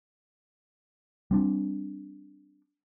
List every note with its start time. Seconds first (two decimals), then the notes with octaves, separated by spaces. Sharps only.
1.31 G3 C4 D4